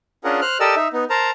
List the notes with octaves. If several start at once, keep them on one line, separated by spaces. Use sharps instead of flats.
C#4 D4 F4 G#4 A#4 F#5
C5 F6 F#6
G4 A4 A#4 D5 D#5 E6
D#4 E5
B3 D#4
A#4 C5 A5 A#5